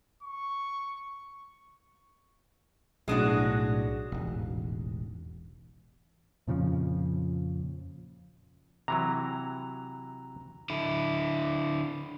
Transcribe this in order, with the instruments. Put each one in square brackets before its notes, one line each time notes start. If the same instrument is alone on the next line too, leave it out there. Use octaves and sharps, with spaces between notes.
[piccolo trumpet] C#6
[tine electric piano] B1 A2 D#6 [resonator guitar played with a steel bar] G#3 D4 F#4
[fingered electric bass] E1 A1 G#2
[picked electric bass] F2 A#2 C#3 F3
[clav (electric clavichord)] C3 E3 F#3 [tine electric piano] A#5
[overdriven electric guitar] D3 E4